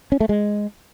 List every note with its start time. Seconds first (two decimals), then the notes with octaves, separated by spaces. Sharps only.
0.12 C#4
0.20 A3
0.29 G#3